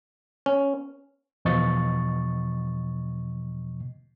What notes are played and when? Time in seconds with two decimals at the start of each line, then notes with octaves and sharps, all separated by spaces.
0.46 C#4
1.45 E2 B2 F3 D#5 C#6 A6